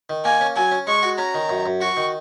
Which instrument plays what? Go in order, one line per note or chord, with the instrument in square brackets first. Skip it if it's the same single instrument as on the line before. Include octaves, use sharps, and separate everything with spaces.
[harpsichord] D#3
[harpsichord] A#3 [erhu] G#5
[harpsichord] C#4
[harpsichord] F#3 [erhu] G#5
[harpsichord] C#4
[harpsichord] G#3 [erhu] C#6
[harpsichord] F#4
[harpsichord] C#4 [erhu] A#5
[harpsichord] D#3
F#2
F#2
[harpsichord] F#4 [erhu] C#6
[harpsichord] D#3